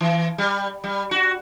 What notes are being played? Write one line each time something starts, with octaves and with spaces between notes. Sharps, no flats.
E3
G3
G3
F#4